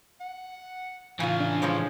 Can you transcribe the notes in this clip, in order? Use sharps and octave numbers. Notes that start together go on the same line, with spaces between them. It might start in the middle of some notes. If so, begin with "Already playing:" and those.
F#5
A2 C#3 E3 F4 G#5
D4
C#3 F3 G#3 C#4